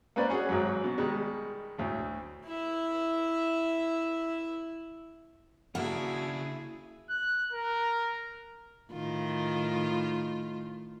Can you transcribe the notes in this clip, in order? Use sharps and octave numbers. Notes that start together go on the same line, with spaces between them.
A#3 C4 C#4 B4 D5
C#4 F#4 G#4
G#1 G#2 F#3
B2
B2 D#3 G3 G#3
D2 A2
E4 E5
C#3 A#3 D4 E4 F#4 G#4 F5 F#5
F#6
A#4
A2 D#3 F4